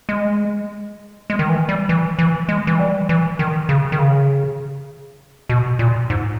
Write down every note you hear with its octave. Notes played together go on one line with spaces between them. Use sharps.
G#3
G#3
D#3
E3
G3
E3
E3
G#3
E3
G3
E3
D#3
C#3
D#3
C#3
B2
A#2
G#2